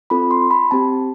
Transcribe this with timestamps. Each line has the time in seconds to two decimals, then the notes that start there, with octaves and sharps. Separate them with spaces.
0.10 C4 F4 A4 B5
0.31 C6
0.51 B5
0.71 C4 G4 A5